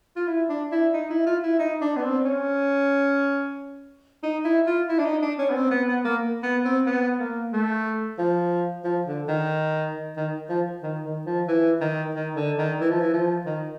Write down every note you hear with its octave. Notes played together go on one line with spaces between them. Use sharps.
F4
E4
D4
E4
D#4
E4
F4
E4
D#4
D4
B3
C4
C#4
D#4
E4
F4
E4
D4
D#4
D4
C#4
B3
C4
B3
B3
A#3
B3
C4
B3
A#3
A3
F3
F3
D3
D#3
D#3
F3
D#3
D#3
F3
E3
D#3
D#3
D3
D#3
E3
F3
E3
F3
D#3